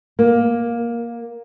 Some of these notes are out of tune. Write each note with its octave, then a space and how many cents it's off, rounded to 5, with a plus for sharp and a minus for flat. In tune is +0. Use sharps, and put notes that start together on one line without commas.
A#3 +10